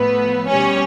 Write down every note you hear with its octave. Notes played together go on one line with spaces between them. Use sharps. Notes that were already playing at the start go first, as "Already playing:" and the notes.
Already playing: A2 F3 A3 B3 B4
B2 G3 C#4 C#5